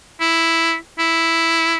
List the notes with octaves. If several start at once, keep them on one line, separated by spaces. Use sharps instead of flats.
E4
E4